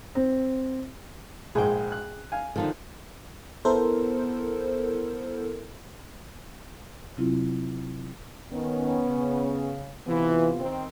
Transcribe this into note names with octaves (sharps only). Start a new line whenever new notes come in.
C4
A#1 G#2 G#4 G5
F#6
F5 G#5
D3 D#3 F3 D#4
B3 E4 A4 A#4 C5
C3 F#3 C4 E4 F4
D#3 B3 C#4
C#3
C3 E3 B3 F4
D#3 C4